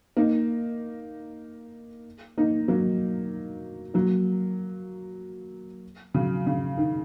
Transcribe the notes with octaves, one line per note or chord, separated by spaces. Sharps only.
A#3 D#4
A#3 D#4
F#3 A#3
F#3 A#3
C#3 F#3
C#3
D#3